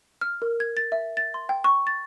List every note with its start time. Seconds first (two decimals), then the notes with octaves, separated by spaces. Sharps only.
0.21 F6
0.42 A#4
0.60 G#6
0.77 A6
0.92 E5
1.17 A6
1.34 C6
1.49 G5
1.64 C#6
1.87 A6